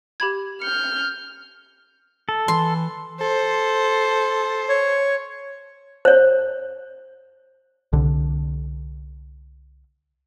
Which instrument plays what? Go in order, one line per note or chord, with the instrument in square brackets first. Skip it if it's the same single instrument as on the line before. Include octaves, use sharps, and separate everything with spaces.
[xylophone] G4 B5 G#6
[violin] F6 G6 [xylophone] C#7
[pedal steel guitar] A4
[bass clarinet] E3 [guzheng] C6
[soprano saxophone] A4 [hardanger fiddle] C5
[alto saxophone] C#5
[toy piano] C5 C#5
[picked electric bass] C2 D3